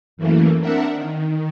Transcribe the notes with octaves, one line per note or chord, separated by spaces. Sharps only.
F#2 E3 A3 A#3
C4 D4 A#4 E5 F#5
D#3